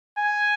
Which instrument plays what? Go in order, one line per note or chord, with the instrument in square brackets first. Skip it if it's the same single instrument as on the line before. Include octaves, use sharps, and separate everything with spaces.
[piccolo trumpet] G#5